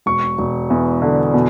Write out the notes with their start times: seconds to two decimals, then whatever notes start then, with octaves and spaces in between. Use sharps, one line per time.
0.06 E1 C#6
0.38 E1
0.70 E2
1.02 D3
1.34 B2